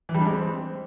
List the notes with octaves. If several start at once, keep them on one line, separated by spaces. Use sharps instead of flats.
E3
G3
D4
G#3
C4